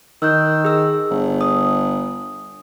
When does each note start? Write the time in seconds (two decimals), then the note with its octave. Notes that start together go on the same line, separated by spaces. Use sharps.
0.22 D#3 E6 F#6 G6
0.65 G#4 E6
1.11 G1
1.41 D#6